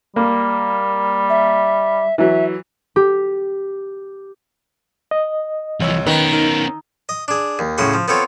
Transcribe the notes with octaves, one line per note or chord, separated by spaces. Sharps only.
G3 A#3
E5
E3 F#3 E5
G4
D#5
C2 E3 F3 C#5 E6
D#3 B3 C#4 B4
D#4 A#4
D#5
D4 G#4
D#2
A2 C#3 F#4 C6
F3
B3 C4 F4 A4 C#5